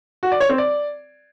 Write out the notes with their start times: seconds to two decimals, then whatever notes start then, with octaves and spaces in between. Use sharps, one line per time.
0.23 F#4
0.32 D5
0.40 C#5
0.49 C4
0.58 D5